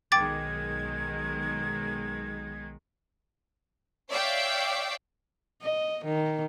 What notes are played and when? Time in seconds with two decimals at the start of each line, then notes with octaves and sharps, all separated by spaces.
0.12 B1 D#3 G#3 G5 D6 G#6 A6
4.10 C#5 D5 E5 F5 G5
5.62 D#5
6.05 D#3